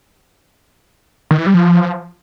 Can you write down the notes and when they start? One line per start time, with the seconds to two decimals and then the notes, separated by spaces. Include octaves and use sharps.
1.31 D#3
1.39 E3
1.46 G3
1.54 F3